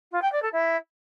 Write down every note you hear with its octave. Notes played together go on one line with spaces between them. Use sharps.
F4
G5
D5
A4
E4